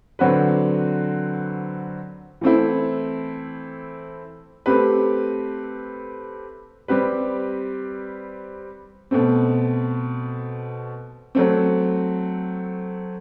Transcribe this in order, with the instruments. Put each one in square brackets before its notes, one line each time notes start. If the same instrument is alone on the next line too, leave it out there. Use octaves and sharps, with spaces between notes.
[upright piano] D3 F#3 C4 F#4 B4
E3 A3 C4 E4
A3 C4 G4 B4
G3 C4 G4 B4
B2 A3 C4
F#3 A3 C4